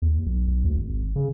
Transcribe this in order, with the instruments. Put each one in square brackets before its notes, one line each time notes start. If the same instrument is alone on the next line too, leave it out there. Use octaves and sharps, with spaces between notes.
[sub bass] D#2
B1
B1
D2
G#1
C#3